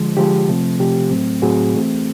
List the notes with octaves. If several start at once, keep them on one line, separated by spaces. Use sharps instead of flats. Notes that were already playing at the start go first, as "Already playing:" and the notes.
Already playing: D3 F3 G#3
D3 F3 G#3 G4
C3 F3 A3 C4
C3 F3 A3 C4 G4
A2 F#3 A3 C4
A2 F#3 A3 C4 F#4 G#4
E3 A3 C4